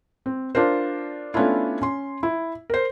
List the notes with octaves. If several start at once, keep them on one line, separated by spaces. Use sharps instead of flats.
C4
D4 F4 A#4 C5
A3 B3 C#4 D4 E4 F4
C#4 C6
E4
A#4 C5